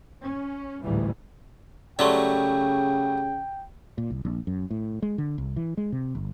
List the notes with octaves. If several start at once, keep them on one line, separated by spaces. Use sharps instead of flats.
C#4
A1 D2 G#2 E3 G3
C#3 F#3 G3 A3 D5 G5 C6
A#2
C2
A#1
F#2
A2
G#3
D3
C2
E3
G#3
C3
G1